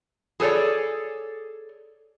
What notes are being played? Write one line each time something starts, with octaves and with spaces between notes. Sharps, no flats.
G#4 A4 B4 C#5 D5